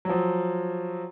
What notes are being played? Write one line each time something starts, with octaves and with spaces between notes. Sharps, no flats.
F3 F#3